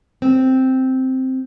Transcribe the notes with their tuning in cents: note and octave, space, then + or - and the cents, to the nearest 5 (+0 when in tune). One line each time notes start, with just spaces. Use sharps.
C4 -5